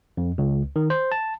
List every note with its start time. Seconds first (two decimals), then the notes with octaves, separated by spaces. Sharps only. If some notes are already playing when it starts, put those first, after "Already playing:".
0.17 F2
0.38 C#2
0.76 D#3
0.90 C5
1.12 A5